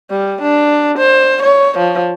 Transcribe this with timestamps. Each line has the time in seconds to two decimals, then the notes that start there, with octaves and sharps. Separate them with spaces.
0.11 G3
0.42 D4
0.99 C5
1.43 C#5
1.78 F3